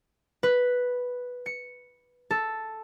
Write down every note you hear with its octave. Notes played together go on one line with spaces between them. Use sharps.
B4
C#7
A4